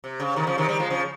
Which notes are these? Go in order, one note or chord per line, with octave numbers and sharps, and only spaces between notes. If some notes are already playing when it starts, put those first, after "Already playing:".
C3
C#3
C3 D#3
C#3 F3
C3 D#3
D#3 G3
F3 G#3
C#3 F3